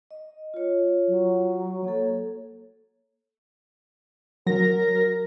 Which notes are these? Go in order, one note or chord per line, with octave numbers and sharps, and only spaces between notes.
D#5
F4 C#5
F#3
A#3 A4 C#5
F#3 A#4 A#6